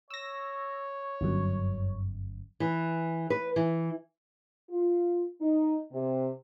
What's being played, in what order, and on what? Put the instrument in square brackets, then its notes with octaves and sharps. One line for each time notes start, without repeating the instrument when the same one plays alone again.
[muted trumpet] C#5 [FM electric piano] E6 A#6
[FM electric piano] G1 F#2
[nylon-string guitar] E3
B4
E3
[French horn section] F4
D#4
C3